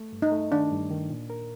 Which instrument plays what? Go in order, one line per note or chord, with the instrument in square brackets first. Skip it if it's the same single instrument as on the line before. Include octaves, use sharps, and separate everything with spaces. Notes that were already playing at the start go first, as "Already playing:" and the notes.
Already playing: [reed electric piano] A3
G2
[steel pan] D#4
[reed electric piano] A3
[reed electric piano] D#3 [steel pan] D4
[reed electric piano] G2
D#3
A#2
A#4